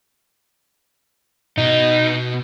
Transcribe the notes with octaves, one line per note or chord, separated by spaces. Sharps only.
B2 D#4